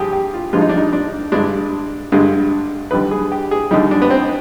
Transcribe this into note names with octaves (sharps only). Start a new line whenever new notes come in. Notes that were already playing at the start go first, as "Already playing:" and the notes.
Already playing: G2 D3 F3 G4 G#4
G4
F4
G2 D3 F3 G#3 F4
D#4
D4
D#4
D4
G2 D3 G#3 D4
G2 D3 G#3
D#2 D3 G3 B4
G#4
G4
G#4
D#2 D3 G3 D#4
D4
B3
C4